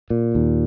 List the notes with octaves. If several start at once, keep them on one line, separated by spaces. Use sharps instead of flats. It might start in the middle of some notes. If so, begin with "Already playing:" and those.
A#2
D#2